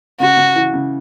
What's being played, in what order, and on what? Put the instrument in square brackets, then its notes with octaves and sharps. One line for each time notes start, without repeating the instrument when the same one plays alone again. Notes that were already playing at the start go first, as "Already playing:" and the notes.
[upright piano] C#3 [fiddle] F#4
[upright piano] C#3
E3
C#3